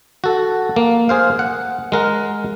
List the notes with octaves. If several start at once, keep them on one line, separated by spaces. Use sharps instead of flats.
F#4 A4
A#3
G#4 C5 F5
F#5
G#3 A#4 F#5